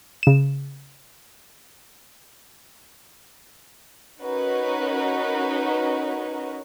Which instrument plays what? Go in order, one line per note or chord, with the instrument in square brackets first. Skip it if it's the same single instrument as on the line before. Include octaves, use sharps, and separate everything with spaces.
[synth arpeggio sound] C#3 E7
[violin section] C#4 D#4 F#4 A#4 B4 C#5